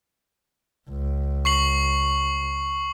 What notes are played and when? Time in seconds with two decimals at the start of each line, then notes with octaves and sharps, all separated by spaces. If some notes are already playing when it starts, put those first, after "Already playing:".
0.89 C#2
1.45 C#6 C7 F#7